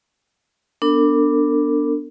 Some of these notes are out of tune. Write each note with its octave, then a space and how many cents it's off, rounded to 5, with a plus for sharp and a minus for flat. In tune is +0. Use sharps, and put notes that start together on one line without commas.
B3 +0 D4 +0 A#4 -45